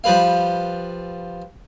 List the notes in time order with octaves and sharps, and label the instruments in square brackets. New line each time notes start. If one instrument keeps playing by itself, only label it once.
[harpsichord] F3 G3 B4 F5